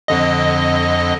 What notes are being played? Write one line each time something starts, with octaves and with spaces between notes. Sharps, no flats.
F2 D3 D#5